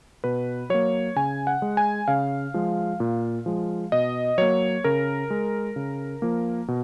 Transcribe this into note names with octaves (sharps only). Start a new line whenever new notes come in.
B2 B4
F#3 A#3 C#5
C#3 G#5
F#5
G#3
G#5
C#3 F5
F3 G#3
A#2
F3 G#3
B2 D#5
F#3 A#3 C#5
C#3 A#4
G#3
C#3
F3 A#3
B2